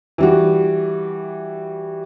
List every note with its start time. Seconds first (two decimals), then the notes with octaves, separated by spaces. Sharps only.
0.18 E3 G3 F#4